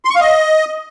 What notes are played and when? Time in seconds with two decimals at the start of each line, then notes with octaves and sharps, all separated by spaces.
0.05 C6
0.10 C#6
0.15 F5
0.21 D#5